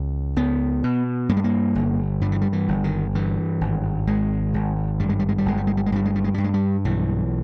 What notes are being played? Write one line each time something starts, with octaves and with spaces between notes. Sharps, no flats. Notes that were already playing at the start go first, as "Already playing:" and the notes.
Already playing: C#2
C#2 B3
B2
G2 A#3
G#3
A#3
G1
G2 G3
E3
G3
E3
G1
D#3
G2 E3
G#1
G#1 G#3
G#1
G2 G3
G#3
G3
G#3
G3
G1 G#3
G3
G#3
G3
G#3
G2 G3
G#3
G3
G#3
G2 G3
G#3
G3
B1 E3